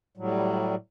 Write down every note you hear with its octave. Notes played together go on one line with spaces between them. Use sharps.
A2 F#3 G3